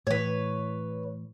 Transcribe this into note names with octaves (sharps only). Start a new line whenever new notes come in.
A2 E3 B4 C#5